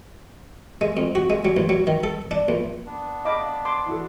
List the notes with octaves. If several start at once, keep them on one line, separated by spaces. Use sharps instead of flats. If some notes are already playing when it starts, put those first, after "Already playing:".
G#3
F2
F#4
G#3
F#3
A1
F#3
D#3
A4
D4
A#1
B3 D4
D#5 F5 A5 B5 D6
C6 D6
E3 F#4 A4